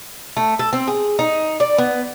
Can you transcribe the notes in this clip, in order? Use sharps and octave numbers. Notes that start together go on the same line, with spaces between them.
A3
A4
C4
G#4
D#4
D5
B3